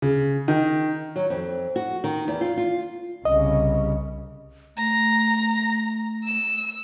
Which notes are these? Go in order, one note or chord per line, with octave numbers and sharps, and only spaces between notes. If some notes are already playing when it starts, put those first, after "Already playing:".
C#3
D#3
F#3
F2
F#4
D#3
E2
F4
F4
C2 C#3 D#5
A3 A#5
E6 E7